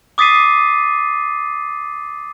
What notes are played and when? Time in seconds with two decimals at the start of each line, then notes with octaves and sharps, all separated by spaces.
0.18 D6 D#6 A6 B6 C7 D#7